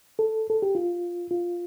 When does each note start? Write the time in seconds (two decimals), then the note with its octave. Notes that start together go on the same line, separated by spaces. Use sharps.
0.19 A4
0.50 A4
0.62 G4
0.75 F4
1.31 F4